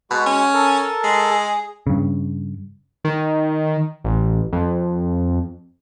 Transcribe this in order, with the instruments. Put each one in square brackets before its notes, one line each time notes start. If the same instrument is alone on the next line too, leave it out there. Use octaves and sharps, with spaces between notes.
[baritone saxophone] B2 [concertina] G#3 F#4
[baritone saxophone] C#4
[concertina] A4 A#4 A5
[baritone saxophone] G#3
[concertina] G#4
[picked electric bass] G2 C#3
[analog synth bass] D#3
A1
F2